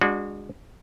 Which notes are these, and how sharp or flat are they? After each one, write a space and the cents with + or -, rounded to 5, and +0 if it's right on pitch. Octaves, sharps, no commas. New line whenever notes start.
G#3 -30 D4 +0 F#4 -25